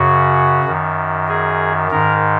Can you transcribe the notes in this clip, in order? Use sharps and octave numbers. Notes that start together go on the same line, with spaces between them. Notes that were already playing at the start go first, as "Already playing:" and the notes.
Already playing: F#2 C#3 F#4
F#2 D#3
G#4
G#2 D#3 A#4